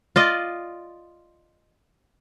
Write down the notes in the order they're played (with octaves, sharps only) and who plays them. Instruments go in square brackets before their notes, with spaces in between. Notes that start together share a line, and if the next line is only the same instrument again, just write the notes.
[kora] F4 D5 D#5